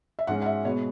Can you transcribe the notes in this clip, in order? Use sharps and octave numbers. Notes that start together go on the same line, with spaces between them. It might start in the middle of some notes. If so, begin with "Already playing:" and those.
E5
G#2 G#3 C#4 F#5
F#5
E5
B2 G#3 B3 C#5